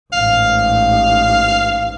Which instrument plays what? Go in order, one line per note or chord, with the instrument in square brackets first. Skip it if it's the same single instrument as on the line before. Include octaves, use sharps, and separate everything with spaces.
[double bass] A1 G#2 [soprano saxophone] F5